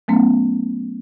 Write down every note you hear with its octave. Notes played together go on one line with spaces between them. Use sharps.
F#3 A3 B3 C#4